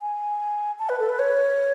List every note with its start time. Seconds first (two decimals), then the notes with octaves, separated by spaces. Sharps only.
0.01 G#5
0.79 A5
0.89 B4
1.00 A4
1.09 B4
1.19 C#5